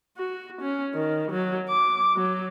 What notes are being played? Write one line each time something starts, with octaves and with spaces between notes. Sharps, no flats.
F#4
C#4
D#3
F#3
D6
F#3